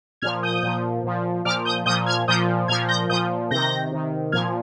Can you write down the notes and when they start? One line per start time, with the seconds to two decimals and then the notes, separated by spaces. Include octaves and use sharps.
0.22 A#2 F6 G#6
0.25 F3
0.43 D#6 G6
0.63 A#2 F3
1.04 A#2 F3
1.45 A#2 F3 D6 F6
1.65 D#6 G6
1.86 A#2 D#6 G6
1.89 F3
2.06 F6 G#6
2.28 A#2 F3 D#6 G6
2.68 A#2 F3 F6 G#6
2.88 G6 A#6
3.09 A#2 D#6 G6
3.12 F3
3.51 C3 D#3 G6 A#6
3.92 C3 D#3
4.32 A#2 F3 F6 G#6